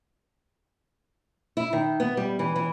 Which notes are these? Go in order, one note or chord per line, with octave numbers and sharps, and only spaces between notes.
E4
D#3
B3
G3
E3
E3